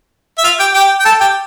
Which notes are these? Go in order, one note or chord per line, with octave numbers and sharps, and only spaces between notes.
E5
F4 F5
G4 G5
G4 G5
G5
A4 A5
G4 G5